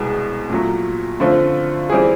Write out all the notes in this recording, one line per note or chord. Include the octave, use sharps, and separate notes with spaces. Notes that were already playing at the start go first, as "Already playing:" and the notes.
Already playing: C2 B2 G#3 B3
A#2 F#3 A3
D3 F3 A3 C4 F4
E3 G3 C4 E4 G#4